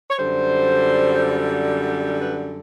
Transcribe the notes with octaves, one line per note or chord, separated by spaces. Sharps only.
C#5
F#2 D3 G3 C5
B4